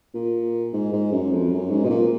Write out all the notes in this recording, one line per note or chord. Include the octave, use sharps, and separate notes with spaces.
A#2
G#2
G#2
F#2
F2
F#2
G#2
B2
A#2